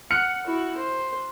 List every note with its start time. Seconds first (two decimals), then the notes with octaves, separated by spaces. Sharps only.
0.11 F#5 F6 F#6 C#7
0.45 E4 F#4
0.77 C5